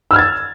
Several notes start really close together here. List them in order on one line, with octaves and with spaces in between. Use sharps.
E6 F6 G#6 A6